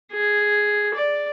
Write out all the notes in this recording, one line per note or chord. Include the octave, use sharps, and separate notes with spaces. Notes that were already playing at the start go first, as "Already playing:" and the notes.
G#4
D5